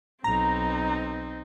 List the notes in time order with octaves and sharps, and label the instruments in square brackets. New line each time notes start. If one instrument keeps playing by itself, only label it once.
[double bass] B1 [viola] C4 D#4 [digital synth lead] A#5